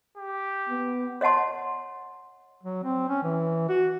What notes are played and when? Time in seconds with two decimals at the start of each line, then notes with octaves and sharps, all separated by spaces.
0.17 G4
0.69 B3
1.21 C#5 D#5 F#5 A5 C6
2.63 F#3
2.84 C4
3.09 C#4
3.23 E3
3.69 F#4